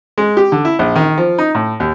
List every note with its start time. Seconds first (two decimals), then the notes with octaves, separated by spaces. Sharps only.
0.18 G#3
0.37 G4
0.52 D3
0.65 E4
0.79 A#1
0.96 D#3
1.17 F3
1.38 D#4
1.55 A2
1.80 D#2